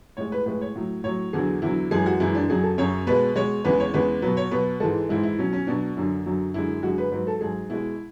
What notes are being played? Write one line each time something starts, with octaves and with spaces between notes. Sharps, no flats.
A2 G#3 C#5
B4
A2 G#3 B4
C#5
A2 F#3
A2 F#3 C#5
E2 D3 F#3 G#4
E2 D3 F#3 E4
F#2 E3 G#3 G#4
F#4
F#2 E3 G#3 E4
D4
F#2 C#3 F#3 G#4
A4
F#2 C#3 F#3 C#5
B2 G#3 B4
B2 G#3 C#5
E2 C#3 G#3 B4
C#5
E2 C#3 G#3 B4
B2 F#3 B4
C#5
B2 F#3 B4
G#2 E3 G#3 A4
G#2 E3 G#3 E4
E4
B2 F#3 C#4
C#4
B2 F#3 D4
F#2 D3 F#3
F#2 D3 F#3
F#2 D3 G#3 E4
F#2 D3 G#3 F#4
B4
G#2 F#3 B4
A4
G#2 F#3 G#4
B2 G#3 E4